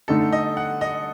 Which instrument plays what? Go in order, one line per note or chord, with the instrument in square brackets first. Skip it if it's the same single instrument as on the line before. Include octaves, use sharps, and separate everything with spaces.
[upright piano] D3 A3 D#4 [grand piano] A4
[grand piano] D#5
F#5
D#5